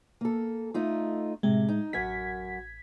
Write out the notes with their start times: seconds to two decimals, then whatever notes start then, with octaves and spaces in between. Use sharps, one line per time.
0.21 A#3 A4
0.74 A3 D#4 F4
1.43 A2 C3 G#3
1.69 D#4
1.93 A1 F#2 A#4 F#5 G#6 B6